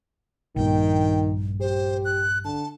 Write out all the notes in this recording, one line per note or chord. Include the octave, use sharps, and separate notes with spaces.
A#1 G2 D#3 G5
G4 C5
F#6
D3 A5